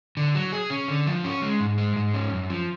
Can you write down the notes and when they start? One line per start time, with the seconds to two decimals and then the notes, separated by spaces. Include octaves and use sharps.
0.17 D3
0.35 F#3
0.52 G#4
0.70 C#4
0.88 D3
1.07 F3
1.24 C#4
1.42 G#3
1.60 G#2
1.78 G#3
1.96 G#2
2.14 C#4
2.32 F#2
2.50 F3